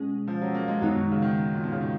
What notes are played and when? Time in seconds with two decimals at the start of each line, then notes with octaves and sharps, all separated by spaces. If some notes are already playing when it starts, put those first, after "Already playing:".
Already playing: B2 G#3 C#4 G#4
0.28 F3
0.42 F#3
0.55 A#3
0.68 G#3
0.81 F#2 D#3 F#3 G#3 B3 D#4
0.95 B2
1.12 C#3
1.22 D#3
1.54 A#2
1.63 B2
1.72 C#3
1.81 D#3